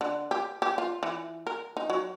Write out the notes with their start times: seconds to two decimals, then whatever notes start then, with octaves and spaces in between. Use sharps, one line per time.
0.01 D3
0.31 G4
0.62 G4
0.78 F4
1.03 E3
1.47 A#4
1.77 D#4
1.90 F#3